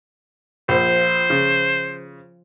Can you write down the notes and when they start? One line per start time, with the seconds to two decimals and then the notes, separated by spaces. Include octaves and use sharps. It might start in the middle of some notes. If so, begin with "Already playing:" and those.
0.69 A#1 F3 C5
1.30 C#3